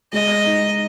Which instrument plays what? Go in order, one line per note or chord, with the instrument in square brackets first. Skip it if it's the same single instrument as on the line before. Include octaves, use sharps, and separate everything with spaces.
[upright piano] G#3 [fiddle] D#5
[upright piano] D#4